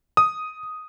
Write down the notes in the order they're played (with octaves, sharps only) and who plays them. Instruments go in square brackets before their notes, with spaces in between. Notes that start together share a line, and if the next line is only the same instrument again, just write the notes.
[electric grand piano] D#6